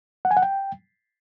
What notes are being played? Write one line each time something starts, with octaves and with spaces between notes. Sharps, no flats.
F#5
G#5
F#5
G5